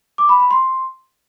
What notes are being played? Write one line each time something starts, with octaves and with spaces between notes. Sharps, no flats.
D6
B5
B5
C6